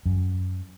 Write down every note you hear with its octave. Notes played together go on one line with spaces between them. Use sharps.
F#2